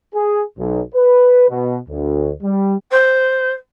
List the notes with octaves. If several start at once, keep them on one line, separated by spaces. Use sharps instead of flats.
G#4
B1
B4
B2
D2
G3
C5